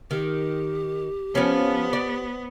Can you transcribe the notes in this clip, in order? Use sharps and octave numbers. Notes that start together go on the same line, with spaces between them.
D#3 G4
F3 B3 C#4
D5